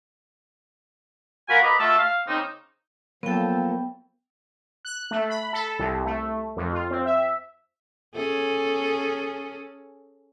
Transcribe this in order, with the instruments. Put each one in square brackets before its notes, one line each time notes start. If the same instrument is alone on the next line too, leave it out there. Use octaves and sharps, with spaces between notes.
[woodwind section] F#4 A#4 F5 G#5 B5
B4 D5 D#5 A#5 B5
A3 F4 F#4 A4 E5 A5
F5
C#3 A#3 C4 D#4
[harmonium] F3 [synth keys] F#3 A4 [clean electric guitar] A#3 [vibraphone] B3 G5
[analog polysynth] F#6
A3
B5
A4
C2
A3
F2
F4
C4
E5
[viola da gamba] C#4 G#4 A4